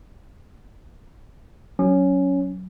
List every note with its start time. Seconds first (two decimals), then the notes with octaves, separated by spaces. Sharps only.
1.79 F#3 C#4